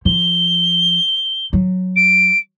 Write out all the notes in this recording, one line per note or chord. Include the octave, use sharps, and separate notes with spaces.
F3 G7
F#3
D7